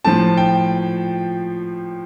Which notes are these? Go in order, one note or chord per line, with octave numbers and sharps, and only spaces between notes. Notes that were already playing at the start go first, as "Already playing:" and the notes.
A2 F3 A5
G5